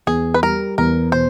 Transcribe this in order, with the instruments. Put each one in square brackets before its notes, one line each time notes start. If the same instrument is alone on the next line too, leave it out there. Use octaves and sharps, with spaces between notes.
[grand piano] E2 [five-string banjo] G#4
[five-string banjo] B4
[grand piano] G3 [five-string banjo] A#4
[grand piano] E2 [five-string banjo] A#4
[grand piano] B2 [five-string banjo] C5